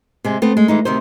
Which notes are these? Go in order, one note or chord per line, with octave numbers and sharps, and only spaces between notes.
C3 G#3 C4
A3 B3 C4
G#3
E3 G#3 D#4
D2 C3 D#3 D#4 C5